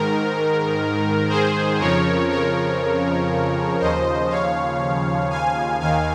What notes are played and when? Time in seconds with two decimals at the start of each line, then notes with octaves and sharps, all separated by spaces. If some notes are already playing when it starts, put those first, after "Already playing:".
Already playing: G#2 D#3 A#4
1.29 G#4 C5
1.79 F2 C#3 F3 A#4 C#5
2.29 A#4 C#5
3.80 D#2 C#3 F3 C5 D#5
4.30 C#5 F5
5.30 F5 G#5
5.80 D#2 D#3 F5 G#5